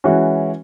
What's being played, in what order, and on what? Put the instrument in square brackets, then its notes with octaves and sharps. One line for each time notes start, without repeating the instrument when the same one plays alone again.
[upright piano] E3 G#3 C#4 F#4